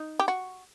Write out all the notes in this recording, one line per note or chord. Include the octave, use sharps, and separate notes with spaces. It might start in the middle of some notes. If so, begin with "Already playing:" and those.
Already playing: D#4
G4
F#4